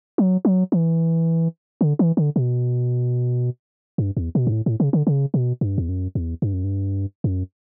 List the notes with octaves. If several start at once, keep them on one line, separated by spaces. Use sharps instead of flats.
F#3
F#3
E3
D3
E3
D3
B2
G2
E2
B2
G2
A2
A2
C#3
D3
C#3
B2
G2
E2
F#2
E2
G2
F#2
G2
F#2